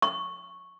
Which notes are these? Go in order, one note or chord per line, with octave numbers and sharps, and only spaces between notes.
C#6